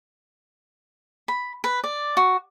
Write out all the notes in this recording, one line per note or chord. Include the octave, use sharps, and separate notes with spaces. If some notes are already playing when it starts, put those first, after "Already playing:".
B5
B4
D5
F#4